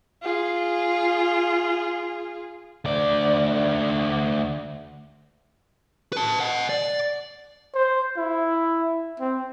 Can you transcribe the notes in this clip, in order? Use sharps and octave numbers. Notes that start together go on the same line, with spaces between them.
F4 G#4
D2 D5
B4 A5
D#5 F#5
D5
C5
E4
C4